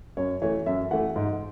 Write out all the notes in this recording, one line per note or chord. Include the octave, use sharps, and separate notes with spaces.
F#2 C#5
E3 A3 C#5
F#2 E5
E3 A3 F#5
G#2